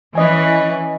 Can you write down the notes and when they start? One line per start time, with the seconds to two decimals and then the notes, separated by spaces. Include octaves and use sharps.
0.15 E3 C#4 B4 D#5 G#5